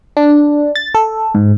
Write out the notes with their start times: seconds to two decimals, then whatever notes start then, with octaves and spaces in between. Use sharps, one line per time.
0.17 D4
0.75 A6
0.95 A4
1.35 G#2